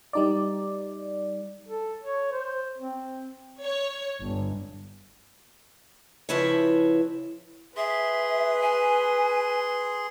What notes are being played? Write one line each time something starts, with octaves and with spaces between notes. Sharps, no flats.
G3 D#4 D5
A4
C#5
C5
C4
C#5
G1
F2 C#3 F3 E4 B4 C#5
G#4 B4 E5 C6
G#5